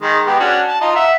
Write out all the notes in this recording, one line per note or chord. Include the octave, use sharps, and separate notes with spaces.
D#3 G#3
G#3 B3 G4
C#4 D4 F#4
A5
D#4 F4 D#5
E5 F#5